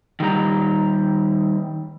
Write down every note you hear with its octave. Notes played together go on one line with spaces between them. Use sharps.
D#3 G3 A#5